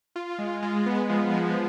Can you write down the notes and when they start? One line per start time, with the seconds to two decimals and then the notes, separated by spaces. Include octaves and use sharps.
0.16 F4
0.38 G#3
0.63 G#3
0.86 B3
1.09 F3
1.33 F3